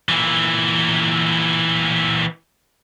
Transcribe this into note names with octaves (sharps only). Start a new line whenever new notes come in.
A#2 E3